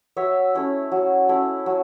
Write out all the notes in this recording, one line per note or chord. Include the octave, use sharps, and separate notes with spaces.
F#3 C#5 E5
A3 C#4 E4
F#3
A3 C#4 E4
F#3